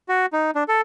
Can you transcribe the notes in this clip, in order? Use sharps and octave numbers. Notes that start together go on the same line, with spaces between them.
F#4
D#4
D4
A4